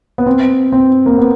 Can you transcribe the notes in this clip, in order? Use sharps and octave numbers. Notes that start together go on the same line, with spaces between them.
B3
C4
C4
A#3
B3